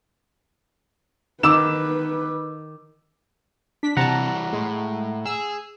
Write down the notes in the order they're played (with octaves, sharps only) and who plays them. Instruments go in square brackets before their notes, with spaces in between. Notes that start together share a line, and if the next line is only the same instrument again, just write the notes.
[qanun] D#3 [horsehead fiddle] B4 [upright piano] D6 E6 E7
[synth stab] D4 B6
[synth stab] C3 A5 [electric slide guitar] E3 G3 [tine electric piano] F#5 A#5
[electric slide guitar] A2 [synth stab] G#3
[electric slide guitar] G#4 [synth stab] E6